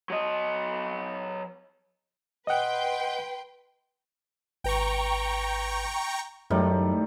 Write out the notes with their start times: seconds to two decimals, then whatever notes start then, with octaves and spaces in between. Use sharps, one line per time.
0.10 F#3 D#5
2.47 B4 D#5 F#5 G5 C6
4.64 G#1 B4 G5 A#5 C#6
6.50 F#2 A2 D#3 F#3 G3 A3